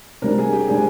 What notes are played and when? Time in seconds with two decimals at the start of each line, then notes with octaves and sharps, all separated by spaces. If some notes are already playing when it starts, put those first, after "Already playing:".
0.22 C3 G3 D4 A#4
0.38 G#4
0.53 G4
0.68 C3 G3 D4 G#4